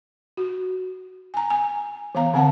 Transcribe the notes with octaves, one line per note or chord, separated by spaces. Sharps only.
F#4
G#5 A#5
G#5
E3 B3 F5 A#5
D3 C4 F#5 A5